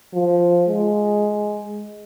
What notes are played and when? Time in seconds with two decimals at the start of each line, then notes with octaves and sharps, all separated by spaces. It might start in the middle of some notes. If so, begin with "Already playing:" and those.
0.14 F3
0.69 G#3